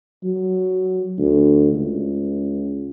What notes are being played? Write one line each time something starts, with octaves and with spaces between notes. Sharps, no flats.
F#3
D2
C#2